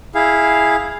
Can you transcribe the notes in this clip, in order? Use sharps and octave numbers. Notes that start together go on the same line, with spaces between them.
E4 G#4 F5